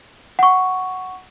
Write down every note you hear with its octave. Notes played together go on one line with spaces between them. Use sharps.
F#5 C#6